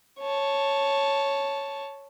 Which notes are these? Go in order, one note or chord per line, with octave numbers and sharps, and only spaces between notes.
C#5 A5